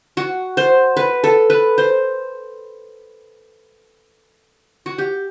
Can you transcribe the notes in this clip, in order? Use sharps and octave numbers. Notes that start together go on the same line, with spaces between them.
F#4
C5
B4
A4
B4
C5
F#4
G4